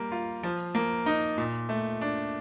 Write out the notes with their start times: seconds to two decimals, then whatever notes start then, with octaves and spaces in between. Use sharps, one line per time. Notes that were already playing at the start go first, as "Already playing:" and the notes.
Already playing: G3 A#3
0.12 F4
0.43 F3
0.75 A#3
1.06 D#4
1.38 A#2
1.69 A3
2.01 D4